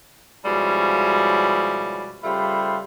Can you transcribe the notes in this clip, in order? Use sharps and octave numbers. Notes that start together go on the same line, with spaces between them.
B2 F3 G3 G#3 C#4 E4
C#3 G3 A3 F4 C5 B5